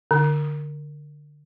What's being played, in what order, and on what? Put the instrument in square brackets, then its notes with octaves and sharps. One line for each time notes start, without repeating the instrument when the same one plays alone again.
[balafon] D3